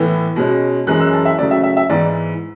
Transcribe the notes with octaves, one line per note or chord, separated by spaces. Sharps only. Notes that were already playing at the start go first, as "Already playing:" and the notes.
Already playing: A2 E3 B3
B2 G#3 C#4
F#2 E3 G#3 C#4 F#6
E6
A5
E5
C#3 F#3 A3 C#4 D5
E5
E5
E5
G#2 E3 B3 D5